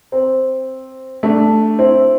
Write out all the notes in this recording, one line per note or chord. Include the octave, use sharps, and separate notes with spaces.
C4
A3 D4
C4 E4